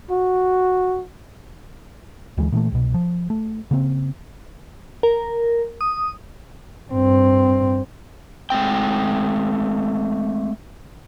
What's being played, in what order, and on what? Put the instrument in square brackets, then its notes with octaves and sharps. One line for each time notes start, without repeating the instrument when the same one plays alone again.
[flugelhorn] F#4
[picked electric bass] D2 E3 G#3
A#2 E3 G#3 A3
C2 B2
F3
A3
C#3 A#3 C4
[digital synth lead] A#4
D#6
[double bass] G2 C4
[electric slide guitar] G#3 A3 C4 G5